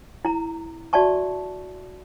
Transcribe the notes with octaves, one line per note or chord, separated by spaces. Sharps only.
E4 A#5
F#4 D5 E5 A5 C#6